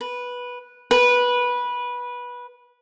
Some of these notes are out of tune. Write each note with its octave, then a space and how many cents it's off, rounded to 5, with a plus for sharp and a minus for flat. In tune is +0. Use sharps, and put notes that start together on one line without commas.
B4 -10
B4 -15